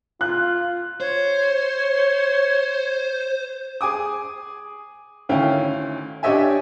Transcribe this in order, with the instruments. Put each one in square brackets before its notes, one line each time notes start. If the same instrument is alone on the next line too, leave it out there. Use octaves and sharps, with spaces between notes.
[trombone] F4 [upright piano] F#6
[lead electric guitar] C5 [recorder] C#5
[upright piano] G#4 G#5 D6 D#6
D2 D#3 C#4 E4 F5 G5
D4 G4 C#5 D#5 E5 G#5